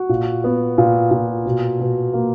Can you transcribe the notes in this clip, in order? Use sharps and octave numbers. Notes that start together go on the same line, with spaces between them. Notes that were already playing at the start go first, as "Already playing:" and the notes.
Already playing: F#4
A#2
B3
A#2
A#2
B2
B2
A#3